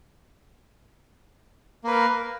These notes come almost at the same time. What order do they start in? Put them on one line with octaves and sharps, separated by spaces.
A#3 B4 A#4